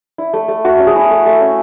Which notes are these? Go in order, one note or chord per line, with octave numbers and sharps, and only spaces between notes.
E4
A3
A3
A3 F#4
C#4
G#4
E4
A3
A3
C#4